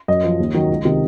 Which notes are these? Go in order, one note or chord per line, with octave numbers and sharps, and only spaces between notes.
F#2 D#5
F3
D#2
D#3 F#3
C#2
C3 D#3